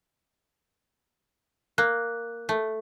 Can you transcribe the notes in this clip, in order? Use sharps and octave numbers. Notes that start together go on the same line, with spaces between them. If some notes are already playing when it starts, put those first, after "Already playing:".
A#3 F#6
A3